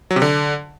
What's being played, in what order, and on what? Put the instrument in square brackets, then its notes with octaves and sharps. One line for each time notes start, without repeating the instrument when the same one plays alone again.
[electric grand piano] F#3
C3
D3